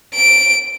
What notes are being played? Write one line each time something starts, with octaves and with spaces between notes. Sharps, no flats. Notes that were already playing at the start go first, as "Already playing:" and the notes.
D7